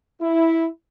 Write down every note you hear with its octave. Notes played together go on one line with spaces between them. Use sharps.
E4